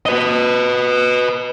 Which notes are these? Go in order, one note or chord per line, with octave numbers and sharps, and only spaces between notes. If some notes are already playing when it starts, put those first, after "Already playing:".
B4 D#5